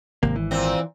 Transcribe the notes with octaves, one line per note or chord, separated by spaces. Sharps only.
G#1 C3 A#3
E3
A#2 C4